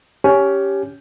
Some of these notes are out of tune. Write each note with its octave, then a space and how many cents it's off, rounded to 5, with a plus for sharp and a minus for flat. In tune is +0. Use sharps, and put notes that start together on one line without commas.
C#4 +15 G4 +0